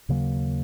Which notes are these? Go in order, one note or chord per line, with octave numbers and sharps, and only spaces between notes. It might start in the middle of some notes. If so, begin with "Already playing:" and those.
D#2 C#3 F#3 A#3